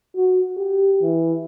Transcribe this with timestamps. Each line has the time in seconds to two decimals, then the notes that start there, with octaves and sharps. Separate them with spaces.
0.16 F#4
0.57 G4
1.02 E3